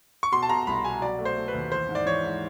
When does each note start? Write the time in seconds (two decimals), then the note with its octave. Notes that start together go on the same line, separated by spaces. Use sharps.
0.23 C#6
0.32 B2 C6
0.43 A5
0.49 B2 A#5
0.67 C2 B5
0.84 B2 G#5
1.02 F#3 D5
1.19 A3
1.25 C5
1.37 A3
1.48 B4
1.54 D#2
1.72 E3 C5
1.89 G#2
1.95 D5
2.06 E3 C#5
2.24 G#2